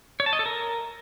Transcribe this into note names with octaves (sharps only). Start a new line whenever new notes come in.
C#5
A5
D#5
A4
A#4